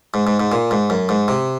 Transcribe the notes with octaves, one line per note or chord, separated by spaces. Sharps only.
G#2
G#2
G#2
A#2
G#2
F#2
G#2
C3